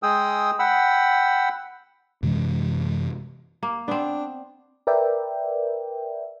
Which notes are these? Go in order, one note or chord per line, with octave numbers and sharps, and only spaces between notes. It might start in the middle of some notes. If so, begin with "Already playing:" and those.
G#3 G#4 G5 D#6 E6
F#5 G5 B5 E6
F#2 C3 E3 G#3
A#3
B3 C4 D4
A#4 B4 D5 E5 G5